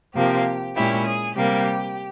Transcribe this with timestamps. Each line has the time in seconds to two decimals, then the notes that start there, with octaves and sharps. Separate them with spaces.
0.14 C3 F3 A#3 G4
0.75 A#2 G#3 C#4 E4 G4
1.06 G#4
1.36 C3 G3 A#3 G4